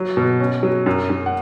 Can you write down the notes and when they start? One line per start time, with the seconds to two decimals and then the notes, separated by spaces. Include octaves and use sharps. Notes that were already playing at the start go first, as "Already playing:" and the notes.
Already playing: F#3
0.17 B2
0.40 C#4
0.63 F#3
0.86 F#2
1.10 F#2
1.26 F#5